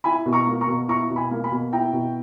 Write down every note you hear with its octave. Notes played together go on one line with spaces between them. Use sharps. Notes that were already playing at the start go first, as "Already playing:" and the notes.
E4 G#5 B5
B2
A#5 C#6
A#3
A#5 C#6
B2
E4 A#5 C#6
B2
G#5 B5
A#3
G#5 B5
B2
E4 G5 A#5
B2